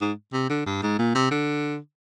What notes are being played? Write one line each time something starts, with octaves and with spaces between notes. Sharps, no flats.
G#2
C3
D3
G2
G#2
A#2
C3
D3